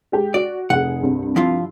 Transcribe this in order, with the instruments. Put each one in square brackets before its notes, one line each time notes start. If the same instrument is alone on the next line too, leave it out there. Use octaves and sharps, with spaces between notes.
[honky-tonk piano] G#3 G4 G5
[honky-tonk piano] F#4 [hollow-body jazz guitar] D5
[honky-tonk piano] F1 G#4 [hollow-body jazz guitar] F#5
[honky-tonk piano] C2 G2 C3
[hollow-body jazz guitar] F3 E4 F4